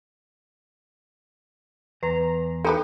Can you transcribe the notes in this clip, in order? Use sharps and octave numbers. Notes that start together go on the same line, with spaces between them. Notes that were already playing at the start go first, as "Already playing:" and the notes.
E2 B4 A#5
D#4 G4 A4 B4